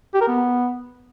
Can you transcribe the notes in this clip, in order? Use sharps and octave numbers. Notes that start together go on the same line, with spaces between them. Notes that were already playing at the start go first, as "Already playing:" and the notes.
G4
A#4
B3